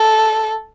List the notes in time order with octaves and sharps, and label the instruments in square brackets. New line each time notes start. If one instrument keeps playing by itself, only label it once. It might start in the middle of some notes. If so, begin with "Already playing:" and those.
Already playing: [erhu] A4